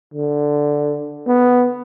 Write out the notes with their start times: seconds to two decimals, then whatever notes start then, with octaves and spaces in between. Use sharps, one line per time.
0.14 D3
1.27 B3